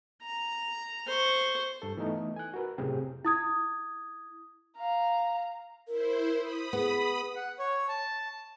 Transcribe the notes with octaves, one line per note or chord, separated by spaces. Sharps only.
A#5
C5 C#6
G2 A4
E3 A3 B3 D#4
G#5 F#6
F#4 A#4 B4
F#2 A2 C3 G#4 G5
E4 D#6 G#6
F5 A#5
E4 A#4 C5
B5 D#6
B3 G#4
F#5
C#5
A5